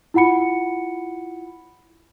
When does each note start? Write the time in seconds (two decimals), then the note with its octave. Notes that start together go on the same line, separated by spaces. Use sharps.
0.14 E4 F4 F#5 B5 C#7